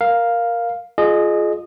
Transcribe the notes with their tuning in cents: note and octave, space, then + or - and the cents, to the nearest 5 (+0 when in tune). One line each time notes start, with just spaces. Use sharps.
A#4 +5 F5 +0
F4 +0 G#4 +20 D#5 -25